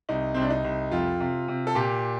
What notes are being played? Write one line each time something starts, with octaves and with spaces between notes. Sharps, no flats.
C2 D#4
C2 C4
D4
D#4
C2
F2 F4
C3
C3
A4
A#2 G4